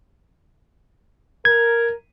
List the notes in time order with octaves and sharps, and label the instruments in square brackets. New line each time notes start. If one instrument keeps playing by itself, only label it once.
[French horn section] A#4 [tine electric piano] G#6